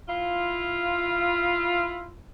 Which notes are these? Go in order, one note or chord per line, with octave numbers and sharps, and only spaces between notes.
E4 F4